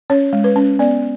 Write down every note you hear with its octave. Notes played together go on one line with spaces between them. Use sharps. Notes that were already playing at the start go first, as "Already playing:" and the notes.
C#4 C#5
G#3
B4
C#4
B3 D5